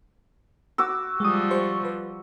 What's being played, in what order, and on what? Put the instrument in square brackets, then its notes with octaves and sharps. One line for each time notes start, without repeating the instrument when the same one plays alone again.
[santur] F#4 D6 E6
[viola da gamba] F3 G3 [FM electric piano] G#3 D#6
[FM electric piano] G4 C5 C#6
B4